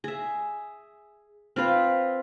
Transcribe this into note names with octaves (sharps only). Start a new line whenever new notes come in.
G#4 E5
C4 F4 B4 F5